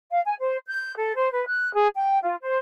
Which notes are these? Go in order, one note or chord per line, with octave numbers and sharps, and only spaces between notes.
F5
G#5
C5
G6
A4
C5
B4
F#6
G#4
G5
F4
C5